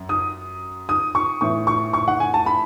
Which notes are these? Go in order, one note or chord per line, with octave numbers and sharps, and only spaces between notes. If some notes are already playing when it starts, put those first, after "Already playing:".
Already playing: F#2
D#6
D#6
C#6
A2 E3 C#6
C#6
C#6
F#5
G#5
A5
B5